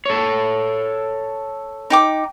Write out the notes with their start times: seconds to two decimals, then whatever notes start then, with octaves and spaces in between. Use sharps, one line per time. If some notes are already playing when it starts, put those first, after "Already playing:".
0.06 A4 C#5
1.90 D#4 G5 D6